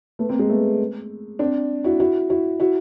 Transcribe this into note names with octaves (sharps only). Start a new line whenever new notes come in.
A3 B3
A#3 C4
G#3 A#3
A3 B3
C4 D4
E4 F#4
E4 F#4
E4 F#4
E4 F#4